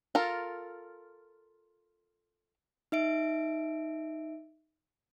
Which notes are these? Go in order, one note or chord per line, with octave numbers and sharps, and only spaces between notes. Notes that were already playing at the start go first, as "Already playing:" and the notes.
F4 A4 A#4
D#4 E5 D7